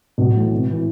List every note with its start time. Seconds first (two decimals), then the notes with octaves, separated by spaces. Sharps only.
0.18 B1
0.34 A2 E3
0.51 G#1
0.71 E3